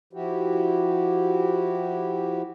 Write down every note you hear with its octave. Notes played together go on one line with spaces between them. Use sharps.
F3 E4 F#4 G4